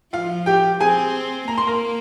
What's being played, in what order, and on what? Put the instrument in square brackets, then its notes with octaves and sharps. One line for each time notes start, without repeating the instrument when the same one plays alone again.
[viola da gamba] F3 [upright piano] F4 F5
[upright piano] G4 G5
[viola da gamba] C4 [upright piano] G#4 G#5
[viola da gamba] A#3 [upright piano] A#5
[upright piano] C6
A#4 A#5